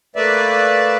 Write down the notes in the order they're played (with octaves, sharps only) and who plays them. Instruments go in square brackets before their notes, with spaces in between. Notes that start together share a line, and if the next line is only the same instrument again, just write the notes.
[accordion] A3 A#3 B4 D5 E5